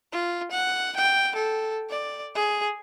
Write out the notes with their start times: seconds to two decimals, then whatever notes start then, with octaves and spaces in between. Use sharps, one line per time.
0.12 F4
0.51 F#5
0.97 G5
1.35 A4
1.90 D5
2.35 G#4